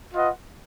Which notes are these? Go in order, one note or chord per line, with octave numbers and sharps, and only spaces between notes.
F4 B4 D#5 F#5